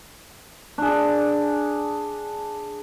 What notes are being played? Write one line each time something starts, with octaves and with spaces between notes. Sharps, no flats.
D4 G#4